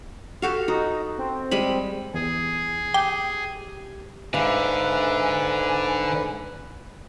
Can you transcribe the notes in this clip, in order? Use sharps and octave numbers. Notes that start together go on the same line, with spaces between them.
F#4 G4 A4 F5
D#4 F#4
C4
G3 G#3 B5
E2 G#4
G4 G5
G#2 D3 B4 E5 F5 G#5